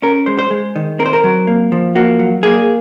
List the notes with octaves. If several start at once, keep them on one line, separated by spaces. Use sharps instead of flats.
C#4 A#4
G#3 C5
C5
G#3
D#3
C4 A#4
C5
A#4
F#3
A#3
F3
A#3 F#4
F#3
A#3 G#4